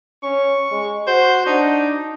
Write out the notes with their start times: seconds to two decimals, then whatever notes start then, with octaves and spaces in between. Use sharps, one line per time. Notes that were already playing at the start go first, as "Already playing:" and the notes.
0.23 C#4 C#6
0.71 G#3
1.07 F#4 C5
1.46 D4 D#4